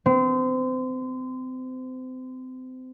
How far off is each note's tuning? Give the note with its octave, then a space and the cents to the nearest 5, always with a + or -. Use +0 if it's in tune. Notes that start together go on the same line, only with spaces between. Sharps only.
C4 -30